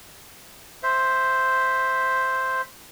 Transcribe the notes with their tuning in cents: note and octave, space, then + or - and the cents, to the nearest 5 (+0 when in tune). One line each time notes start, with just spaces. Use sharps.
C5 +0 E5 +0